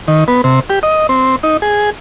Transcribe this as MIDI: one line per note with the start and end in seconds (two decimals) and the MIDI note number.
0.08 0.24 51
0.28 0.42 59
0.44 0.60 48
0.70 0.79 67
0.83 1.07 75
1.09 1.36 60
1.43 1.57 63
1.62 1.90 68